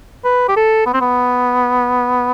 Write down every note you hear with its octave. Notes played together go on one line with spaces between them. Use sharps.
B4
G4
A4
B3
C4
B3